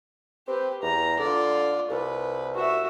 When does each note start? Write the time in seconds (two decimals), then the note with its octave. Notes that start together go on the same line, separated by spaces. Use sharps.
0.48 C4 G4 B4
0.83 E2 A#5
1.19 D3 F4 D5
1.91 C2 B4
2.55 F#4 E5